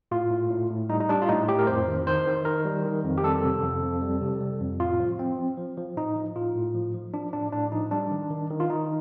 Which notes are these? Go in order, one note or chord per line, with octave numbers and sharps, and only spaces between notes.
A2 F4
A2
A2
A2
G3 D#4
D#4
G3 D4
F4
A2 D#4
A2 G4
A#4
F2 C5
D#3
D#3 C5
D#3
D#3 A#4
G3
D#3
F2
G4
G3 A4
C3
F2
F2
G3
C3
G3
F2
A2 F4
F3
F3 C4
F3
F3
F3
A2 D#4
F3
A2 F4
A2
F3
F3
F3 D4
A2 D4
A2 D4
F3 D#4
G3 D4
D#3
D#3
D#3
F4
D#3 D#4